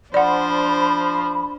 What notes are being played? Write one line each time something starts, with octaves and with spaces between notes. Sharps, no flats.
F3 D4 C5 D5 F#5 B5